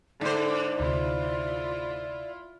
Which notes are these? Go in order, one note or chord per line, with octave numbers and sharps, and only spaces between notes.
G#2 D3 C5 D5
D2 C3 E4 F4